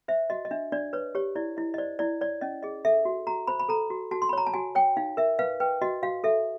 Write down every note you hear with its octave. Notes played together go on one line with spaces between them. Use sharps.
C5 E5
F#4 D#5
D#5
D4 E5
D4 D5
B4 C#5
G4 C#5
E4 D5
E4 D#5
D#5
C5 D5
E4 D5
C#5 D5
C#4 D#5
G#4 D#5
A4 E5
F#4
F#4 A#5
C5 B5
B5
A4 A#5
F#4
F#4 A5
C6
B5
C#5 A#5
A5
F#4 G#5
C#5 G5
D#4 F5
A#4 E5
B4 F5
B4 G5
F#4 D#5
F#4 F5
A4 E5